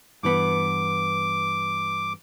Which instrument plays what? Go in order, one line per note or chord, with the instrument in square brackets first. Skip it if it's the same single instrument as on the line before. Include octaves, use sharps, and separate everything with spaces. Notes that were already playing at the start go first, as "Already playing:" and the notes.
[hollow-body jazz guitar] G2 E3 B3 [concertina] D6